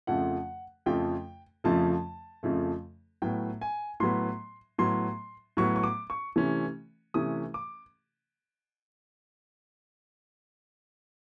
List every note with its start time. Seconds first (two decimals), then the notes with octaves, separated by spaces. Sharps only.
0.07 F2 C#3 F3 A3 F#5
0.86 F2 C#3 F3 A3 G5
1.64 F2 C#3 F3 A3 A5
2.43 F2 C#3 F3 A3
3.22 A2 F#3 B3 G5
3.61 G#5
4.00 A2 F#3 B3 C6
4.78 A2 F#3 B3 C6
5.57 A2 F#3 B3 C#6
5.76 C#6
5.84 D6
6.10 C#6
6.36 C3 E3 A3 C#4
7.14 C3 E3 A3 C#4 D#6
7.54 D6